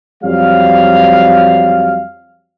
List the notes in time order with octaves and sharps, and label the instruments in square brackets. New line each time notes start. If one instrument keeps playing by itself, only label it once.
[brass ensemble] F2 F#3 G3 F5